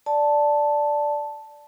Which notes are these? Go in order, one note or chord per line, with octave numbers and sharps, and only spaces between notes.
D5 A5